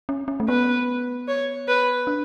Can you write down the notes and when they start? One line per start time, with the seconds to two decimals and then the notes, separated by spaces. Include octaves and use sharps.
0.09 C#4
0.28 C#4
0.40 A3
0.48 B3 B4
1.28 C#5
1.68 B4
2.07 D4